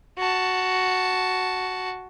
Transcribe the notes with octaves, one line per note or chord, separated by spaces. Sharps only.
F#4 A5